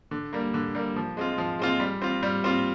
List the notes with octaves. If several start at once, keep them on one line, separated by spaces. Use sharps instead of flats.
D3
G3 A#3
D3
G3 A#3
F3
G#3 C4 F4
F3
G#3 C4 F4
G3
C4 F4
G3
C4 F4